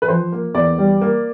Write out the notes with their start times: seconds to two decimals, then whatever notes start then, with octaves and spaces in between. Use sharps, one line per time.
0.02 B4
0.08 F3 C5
0.32 A#3
0.54 E2 D5
0.78 G3
1.01 A#3